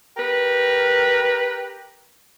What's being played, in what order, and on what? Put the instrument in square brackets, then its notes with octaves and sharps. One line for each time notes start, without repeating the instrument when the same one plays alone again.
[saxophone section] G4 A#4 B4